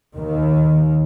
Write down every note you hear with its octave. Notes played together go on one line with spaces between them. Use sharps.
D#2 D#3